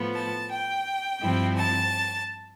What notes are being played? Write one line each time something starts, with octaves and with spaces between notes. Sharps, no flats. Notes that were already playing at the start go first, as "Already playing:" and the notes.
Already playing: A2 F3 B3
A5
G5
G2 F3 C4 E4
A5